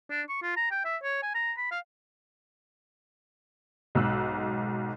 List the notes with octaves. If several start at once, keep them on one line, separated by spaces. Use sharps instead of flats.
D4
C#6
F4
A#5
G5
E5
C#5
G#5
A#5
B5
F5
B1 G#2 E6 F#6